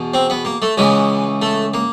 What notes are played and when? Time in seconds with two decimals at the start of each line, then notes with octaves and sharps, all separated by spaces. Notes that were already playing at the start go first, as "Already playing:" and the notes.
Already playing: E2 B2
0.14 C4
0.30 B3
0.45 A#3
0.62 A3
0.77 C#2 C#3 E3 G#3
1.42 A3
1.74 A#3